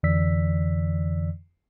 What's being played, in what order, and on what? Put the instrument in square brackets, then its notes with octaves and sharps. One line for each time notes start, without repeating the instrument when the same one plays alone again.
[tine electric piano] F2 D3 E3 D5 E6 B6